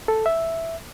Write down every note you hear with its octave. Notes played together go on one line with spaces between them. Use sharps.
A4
E5